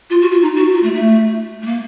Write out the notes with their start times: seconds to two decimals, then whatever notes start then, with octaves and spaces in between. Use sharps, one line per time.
0.10 F4
0.21 F#4
0.31 F4
0.42 D#4
0.57 F#4
0.73 F4
0.83 A3
0.93 A3
1.62 A3
1.66 A#3